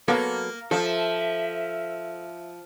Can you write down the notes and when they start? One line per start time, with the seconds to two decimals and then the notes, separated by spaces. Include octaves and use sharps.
0.08 F#3 A#3 B3 A4
0.71 F3 A4 E5